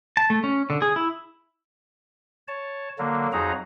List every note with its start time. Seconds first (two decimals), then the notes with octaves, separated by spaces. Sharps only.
0.17 A5
0.30 A3
0.44 C#4
0.70 D3
0.82 G#4
0.96 E4
2.48 C#5 A5
2.99 D3 F#3 A#3
3.33 F2 F#3 D#4 F#4 G#4 A#5